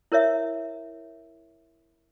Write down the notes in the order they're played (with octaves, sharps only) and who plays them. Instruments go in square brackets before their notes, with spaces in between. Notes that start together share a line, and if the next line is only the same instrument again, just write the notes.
[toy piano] E4 A#4 C#5 E5